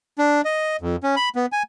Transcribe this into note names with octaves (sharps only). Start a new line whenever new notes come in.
D4
D#5
F2
C#4
B5
B3
G#5